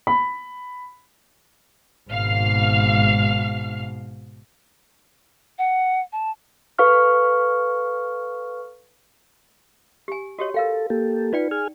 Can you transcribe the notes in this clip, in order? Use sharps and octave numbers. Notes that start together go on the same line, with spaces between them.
B5
G#1 G#2 B2 F5 F6
F#5
A5
A4 B4 F5 C#6 F6
G4 G#5
F#4 G4 C#5 D#5
A4 A#4 F5 G5
A#3 G4 A4
D#4 F4 B4 D5 G5
G#4 G#5 F6